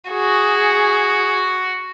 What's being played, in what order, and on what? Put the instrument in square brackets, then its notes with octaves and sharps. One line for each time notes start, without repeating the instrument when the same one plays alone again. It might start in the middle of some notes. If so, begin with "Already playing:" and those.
[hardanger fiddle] F#4 [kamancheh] G#4